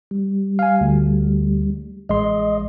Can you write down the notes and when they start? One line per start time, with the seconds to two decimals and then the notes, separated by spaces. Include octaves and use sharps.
0.11 G3
0.59 F5 G#5
0.81 D2
2.09 A1 G#3 D#5 C6